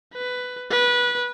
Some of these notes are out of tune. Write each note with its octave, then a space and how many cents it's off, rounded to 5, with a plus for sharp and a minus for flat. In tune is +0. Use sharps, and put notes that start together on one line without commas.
B4 +10
B4 -20